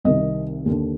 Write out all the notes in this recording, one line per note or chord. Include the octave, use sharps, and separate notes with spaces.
C2 C3 D#3 D#5
D#2 D3